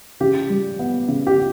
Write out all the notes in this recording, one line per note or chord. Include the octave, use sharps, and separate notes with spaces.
C#3 G4
G3
B3
C#3
G4